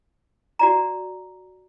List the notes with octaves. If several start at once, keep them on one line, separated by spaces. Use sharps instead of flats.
F#4 D5 A#5